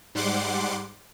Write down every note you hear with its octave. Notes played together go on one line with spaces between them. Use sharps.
G#2 G3 F#5 C6 D6